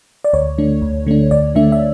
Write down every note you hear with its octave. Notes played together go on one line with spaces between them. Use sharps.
D5
D2 C#5
D3 A3 D4
D2
D3 A3 D4
D2 D5
D3 A3 D4 E5
E5